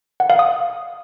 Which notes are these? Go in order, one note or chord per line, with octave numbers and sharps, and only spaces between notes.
F#5
F5
D#6